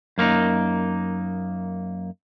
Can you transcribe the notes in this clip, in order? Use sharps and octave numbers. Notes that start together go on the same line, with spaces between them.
F#2 A#3 C4 D#4